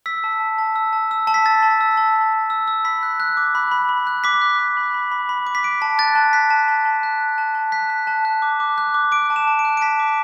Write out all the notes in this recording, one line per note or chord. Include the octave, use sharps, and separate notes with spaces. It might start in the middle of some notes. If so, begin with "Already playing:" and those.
E6 B6
A5
A5
A5
E6
A5
E6
A5
B6
E6 A6
A5
E6
A5
A5
A5
E6
E6
B5 B6
F#6
F#6
D6
B5
B5
B5
F#6
D6 B6
F#6
D6
B5
B5
B5
B5
D6
B6
F#6 D7
A5
F#6 A6
A5
F#6 B6
A5
A5
A5
F#6
F#6
A5
A5
F#6 B6
F#6
A5
F#6
D6
D6
F#6
D6
D6 D7
A5
E7
A5
D7
F#6
D7
A5 B6
D6